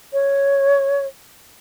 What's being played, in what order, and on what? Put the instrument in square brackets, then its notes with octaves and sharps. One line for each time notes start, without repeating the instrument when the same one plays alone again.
[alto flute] C#5